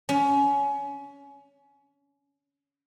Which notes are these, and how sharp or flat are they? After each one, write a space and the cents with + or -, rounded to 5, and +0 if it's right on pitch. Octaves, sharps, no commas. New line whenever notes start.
C#4 +25